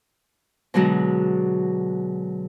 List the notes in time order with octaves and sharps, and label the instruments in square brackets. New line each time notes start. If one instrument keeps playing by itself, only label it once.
[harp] B2 D3 F#3 G#3 F#4